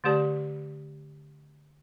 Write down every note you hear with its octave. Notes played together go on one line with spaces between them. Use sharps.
D3 A3 G4 D5 A5